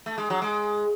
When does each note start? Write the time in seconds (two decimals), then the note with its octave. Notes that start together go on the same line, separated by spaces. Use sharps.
0.06 A3
0.18 G#3
0.30 F#3
0.42 G#3